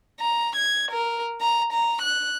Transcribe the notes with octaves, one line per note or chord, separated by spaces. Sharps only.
A#5
G#6
A#4
A#5
A#5
F#6